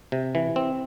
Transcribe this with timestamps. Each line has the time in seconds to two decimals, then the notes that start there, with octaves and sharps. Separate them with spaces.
0.12 C3
0.35 E3
0.56 C4